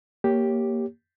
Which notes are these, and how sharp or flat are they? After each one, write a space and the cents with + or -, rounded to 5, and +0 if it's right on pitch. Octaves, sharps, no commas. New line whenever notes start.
A#3 +0 G4 +0 C#5 +0